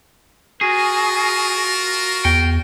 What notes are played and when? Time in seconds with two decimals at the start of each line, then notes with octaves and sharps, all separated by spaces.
0.61 F4 F#4 G#4 A#4
2.25 E2 G5